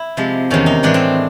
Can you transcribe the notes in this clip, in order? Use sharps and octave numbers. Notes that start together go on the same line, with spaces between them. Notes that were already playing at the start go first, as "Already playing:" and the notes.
Already playing: E4
C3 F3 G#3
E2 C3 D#3 C#4
D#4
A2 E3 G#3 B3 D4
C4